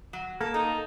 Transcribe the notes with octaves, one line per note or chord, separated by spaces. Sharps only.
F#3
A#3 A4
D#4 A4